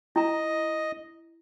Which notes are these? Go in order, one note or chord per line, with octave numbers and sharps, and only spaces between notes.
E4 D#5 A#5